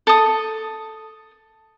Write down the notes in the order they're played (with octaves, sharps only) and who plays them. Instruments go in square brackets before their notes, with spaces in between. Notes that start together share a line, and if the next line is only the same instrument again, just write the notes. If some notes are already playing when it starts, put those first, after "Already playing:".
[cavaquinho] A4 D#6